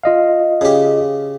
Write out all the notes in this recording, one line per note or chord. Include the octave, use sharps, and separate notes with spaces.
F4 D#5 F5
C#3 G4